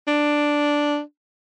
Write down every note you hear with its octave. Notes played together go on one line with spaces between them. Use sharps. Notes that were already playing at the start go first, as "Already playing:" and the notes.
D4